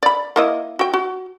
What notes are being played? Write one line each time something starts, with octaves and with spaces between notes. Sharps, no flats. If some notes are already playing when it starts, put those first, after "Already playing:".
D5 B5
A#3 E4 D#5
F#4 G5
F#4